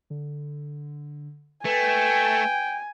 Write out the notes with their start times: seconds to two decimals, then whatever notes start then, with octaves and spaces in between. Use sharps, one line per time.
0.10 D3
1.65 A3 B4 G5 G#5